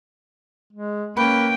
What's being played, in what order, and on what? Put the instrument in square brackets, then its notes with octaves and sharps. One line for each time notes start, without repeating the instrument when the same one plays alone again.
[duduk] G#3
[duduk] A#3 [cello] C#4 G5 [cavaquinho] B4